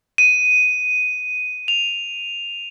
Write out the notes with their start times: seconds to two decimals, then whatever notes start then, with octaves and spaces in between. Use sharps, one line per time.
0.18 D#7
1.68 F7